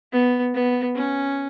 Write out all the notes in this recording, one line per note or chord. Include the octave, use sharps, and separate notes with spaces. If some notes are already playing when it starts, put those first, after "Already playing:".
B3
B3
C#4